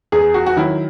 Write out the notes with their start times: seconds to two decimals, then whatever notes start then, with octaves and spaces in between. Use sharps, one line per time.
0.12 E2 G#4
0.34 F#4
0.46 F#4
0.57 D#3 F#3 E4